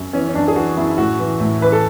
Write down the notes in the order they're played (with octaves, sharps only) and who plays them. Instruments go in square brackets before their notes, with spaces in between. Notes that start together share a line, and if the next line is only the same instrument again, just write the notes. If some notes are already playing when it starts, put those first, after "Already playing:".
Already playing: [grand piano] F#2
E3 C#4
C#4
F#2 D4
G#4
E3 F#4
F#2 E4
E4
A2 F#4
E3
A2
E3 B4
A4